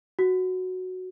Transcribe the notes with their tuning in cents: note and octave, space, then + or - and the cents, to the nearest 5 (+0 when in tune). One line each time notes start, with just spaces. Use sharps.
F#4 -5